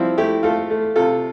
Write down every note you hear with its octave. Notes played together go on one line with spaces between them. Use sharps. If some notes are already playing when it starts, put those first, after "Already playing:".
Already playing: F3 G3 C4 E4
A3 E4 G4
A3 F4 A4
A3
C3 F4 A4